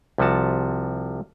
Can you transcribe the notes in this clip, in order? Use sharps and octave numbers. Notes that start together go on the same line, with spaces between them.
C2 C3 F3 F#4 A5